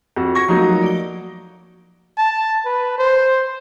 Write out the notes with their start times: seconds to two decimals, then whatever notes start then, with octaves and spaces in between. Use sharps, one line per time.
0.16 F2 F#4
0.35 C#6 G#6 A#6
0.48 F3 F#3 A3 A#3 D#4 F#4
0.83 D5 G7
2.18 A5
2.65 B4
2.98 C5